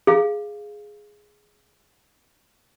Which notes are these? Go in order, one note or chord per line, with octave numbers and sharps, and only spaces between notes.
G#4 F5